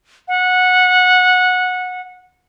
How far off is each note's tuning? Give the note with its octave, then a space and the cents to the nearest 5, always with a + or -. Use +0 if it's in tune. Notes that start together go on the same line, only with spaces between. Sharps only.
F#5 -15